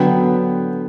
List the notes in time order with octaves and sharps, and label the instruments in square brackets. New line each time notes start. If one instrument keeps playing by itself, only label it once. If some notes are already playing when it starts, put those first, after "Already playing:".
Already playing: [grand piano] D3 F#3 B3 G5